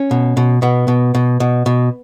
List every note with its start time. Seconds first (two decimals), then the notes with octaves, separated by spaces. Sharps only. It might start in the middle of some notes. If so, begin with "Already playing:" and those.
Already playing: C#4
0.11 B2
0.37 B2
0.62 B2 B3
0.88 B2
1.15 B2
1.40 B2
1.66 B2